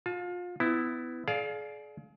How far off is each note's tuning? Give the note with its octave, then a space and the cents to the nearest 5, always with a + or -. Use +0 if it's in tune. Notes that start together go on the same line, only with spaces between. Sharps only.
F4 +30 A5 -30
B3 +25 E4 +0
G#4 +40 D5 +0 F5 +0